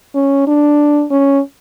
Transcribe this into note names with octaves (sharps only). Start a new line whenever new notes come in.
C#4
D4
C#4